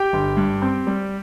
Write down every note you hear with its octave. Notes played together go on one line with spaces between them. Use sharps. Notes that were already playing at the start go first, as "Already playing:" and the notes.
Already playing: G4 G5
G1
G2
C4
G3